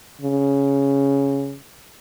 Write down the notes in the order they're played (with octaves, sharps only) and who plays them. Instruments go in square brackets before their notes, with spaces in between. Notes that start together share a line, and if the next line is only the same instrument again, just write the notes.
[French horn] C#3